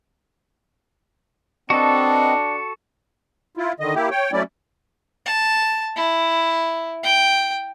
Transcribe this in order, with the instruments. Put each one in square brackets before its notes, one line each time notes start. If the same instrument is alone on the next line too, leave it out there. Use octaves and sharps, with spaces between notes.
[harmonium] C4 B4 D#5 [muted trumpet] D4 [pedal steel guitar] F#4 A4
[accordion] E4 F4
D3 D#3 D#5
A#3 E4 G4
C#5 G5
F#3 A3 C#4 E4 D5
[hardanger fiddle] A5
E4
G5